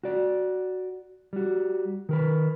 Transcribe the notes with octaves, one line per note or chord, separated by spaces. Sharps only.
F#4 D5
G3 F#4
D#3 A#4 B4